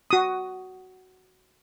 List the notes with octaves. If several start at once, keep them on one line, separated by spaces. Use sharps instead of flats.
F#4 D#6